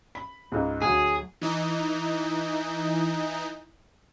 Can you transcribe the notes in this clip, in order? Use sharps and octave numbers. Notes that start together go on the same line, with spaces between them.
B5
C#2 G#2
D2 F#3 G#4
E3 D#4